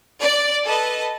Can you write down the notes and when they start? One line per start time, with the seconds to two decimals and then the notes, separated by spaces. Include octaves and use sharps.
0.20 D5
0.64 A4 B4 D#5